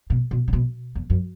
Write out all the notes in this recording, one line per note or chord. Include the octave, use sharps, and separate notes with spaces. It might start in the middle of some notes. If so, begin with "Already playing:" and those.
B2
B2
C#3
B2
E2
F#2